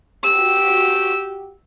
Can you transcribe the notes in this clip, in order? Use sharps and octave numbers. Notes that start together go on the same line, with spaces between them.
F#4 G4 E6